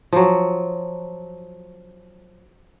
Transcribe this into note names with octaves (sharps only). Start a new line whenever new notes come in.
F3 F#3